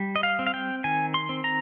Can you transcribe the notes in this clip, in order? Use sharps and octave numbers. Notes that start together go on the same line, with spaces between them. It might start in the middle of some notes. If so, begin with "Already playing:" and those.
Already playing: G3
D#5
F5
C4
F5
G5
D#3 G#5
C6
C4
A#5